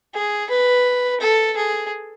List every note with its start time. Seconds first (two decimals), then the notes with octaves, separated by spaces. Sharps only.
0.14 G#4
0.49 B4
1.20 A4
1.56 G#4